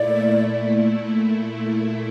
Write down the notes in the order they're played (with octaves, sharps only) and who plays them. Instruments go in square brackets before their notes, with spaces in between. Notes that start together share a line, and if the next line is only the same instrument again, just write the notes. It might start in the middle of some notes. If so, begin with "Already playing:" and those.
Already playing: [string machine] A#2 A3 E4 [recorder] D5